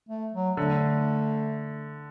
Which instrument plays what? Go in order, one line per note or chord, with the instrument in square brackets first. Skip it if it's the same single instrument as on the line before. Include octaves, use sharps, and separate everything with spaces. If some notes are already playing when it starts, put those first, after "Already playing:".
[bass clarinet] A3
F#3
[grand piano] D3 [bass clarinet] A3